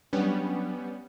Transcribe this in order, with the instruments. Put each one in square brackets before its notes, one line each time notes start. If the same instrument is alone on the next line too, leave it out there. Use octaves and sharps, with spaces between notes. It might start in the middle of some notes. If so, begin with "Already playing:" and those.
[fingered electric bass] F#3 D4 [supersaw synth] G3 B3 C#4